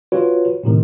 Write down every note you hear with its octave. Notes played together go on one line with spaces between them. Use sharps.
F4 F#4 B4 C#5
A2 C3 D#3